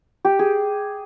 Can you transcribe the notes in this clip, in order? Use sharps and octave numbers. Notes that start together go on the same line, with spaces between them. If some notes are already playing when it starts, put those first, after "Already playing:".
G4
G#4